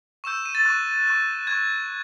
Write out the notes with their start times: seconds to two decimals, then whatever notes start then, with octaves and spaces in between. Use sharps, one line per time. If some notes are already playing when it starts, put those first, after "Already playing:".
0.24 C#6 E6 G6 E7
0.46 D#7
0.55 A6
0.65 C#6 F#6
1.07 C#6 F#6
1.47 C#6 F#6 G#6